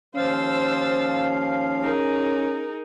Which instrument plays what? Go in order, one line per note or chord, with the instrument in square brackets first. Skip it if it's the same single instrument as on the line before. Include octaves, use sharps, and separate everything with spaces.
[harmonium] D#2 F3 F5 [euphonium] C#4 [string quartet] C5 E6 A6
[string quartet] D#4 G#4 A#4